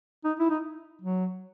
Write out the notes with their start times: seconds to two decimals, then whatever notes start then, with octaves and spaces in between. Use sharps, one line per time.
0.24 D#4
0.39 E4
0.50 D#4
1.01 F#3